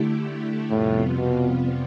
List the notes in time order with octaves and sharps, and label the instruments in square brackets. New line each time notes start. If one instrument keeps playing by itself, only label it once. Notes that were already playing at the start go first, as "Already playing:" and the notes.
Already playing: [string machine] D3 A3 E4 G4
[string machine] F2 C3 G3 B3 F4 [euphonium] A2
[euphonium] B2